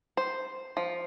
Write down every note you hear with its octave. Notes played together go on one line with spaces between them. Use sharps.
C5
F3